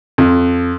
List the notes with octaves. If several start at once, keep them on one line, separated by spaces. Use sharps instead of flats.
F2